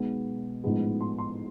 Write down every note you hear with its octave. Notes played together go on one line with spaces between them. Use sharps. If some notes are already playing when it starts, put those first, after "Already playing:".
Already playing: B1 B2 G#3 B3
A1 G#2 F3 G#3 B3
C6
C6